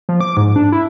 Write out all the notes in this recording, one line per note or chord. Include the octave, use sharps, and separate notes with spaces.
F3
D6
G#2
D4
E4